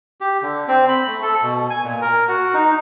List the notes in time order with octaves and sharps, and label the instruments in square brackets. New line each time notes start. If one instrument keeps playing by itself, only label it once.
[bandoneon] G4
D3
C4
B5
A3
A4
B2
G#5
A#2
A#4
F#4
D#4